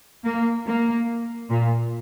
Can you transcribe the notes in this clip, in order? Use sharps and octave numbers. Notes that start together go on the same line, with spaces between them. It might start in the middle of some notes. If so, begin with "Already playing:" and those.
A#3
A#3
A#2